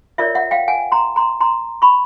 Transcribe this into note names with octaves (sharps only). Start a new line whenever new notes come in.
F4 A#4 C#5 D5 E5
E5 F#5
F5 G5
F#5 G#5
A#5 C6
A#5 C6
A#5 C6
B5 C#6